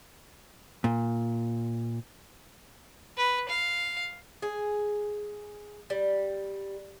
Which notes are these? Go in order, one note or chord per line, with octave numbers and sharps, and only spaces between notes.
A#2
B4
F5
G#4
G3